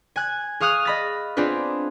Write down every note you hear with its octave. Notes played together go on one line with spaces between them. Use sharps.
G#5 F#6 G#6
G#4 F5 C#6 D#6 F6 F#6
D#5 B5 A6
B3 C4 D4 F4 G#4 B4